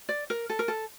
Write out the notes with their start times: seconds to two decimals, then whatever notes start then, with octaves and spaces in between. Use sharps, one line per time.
0.09 D5
0.30 A#4
0.50 A4
0.59 A#4
0.68 A4